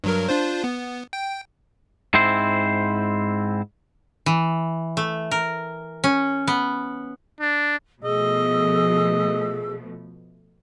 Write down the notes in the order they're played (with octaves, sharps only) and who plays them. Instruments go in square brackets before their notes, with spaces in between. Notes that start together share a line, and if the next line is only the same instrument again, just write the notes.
[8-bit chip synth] G2 F#3 A#4
D4 F4 C5
B3
G5
[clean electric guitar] G#2 C4 E4 C5
[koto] E3
A3
A#4
C#4
B3
[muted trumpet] D4
[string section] B2 F3 A3 [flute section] G#4 E6 [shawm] D#5